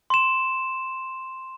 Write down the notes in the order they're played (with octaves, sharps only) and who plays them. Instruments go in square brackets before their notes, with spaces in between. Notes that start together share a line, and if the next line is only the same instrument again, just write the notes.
[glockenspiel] C6 E7